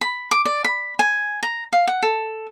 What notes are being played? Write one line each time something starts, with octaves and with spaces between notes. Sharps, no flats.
B5
D6
D5
B5
G#5
A#5
F5
F#5
A4